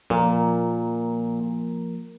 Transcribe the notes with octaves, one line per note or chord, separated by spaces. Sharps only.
A#2 F3 A#3 A#4